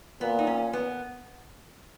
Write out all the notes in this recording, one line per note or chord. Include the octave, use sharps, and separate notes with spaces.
A#2 B3
D#4
C#4
B3